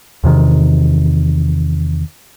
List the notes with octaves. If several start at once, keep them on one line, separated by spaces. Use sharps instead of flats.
E2 C3 D#3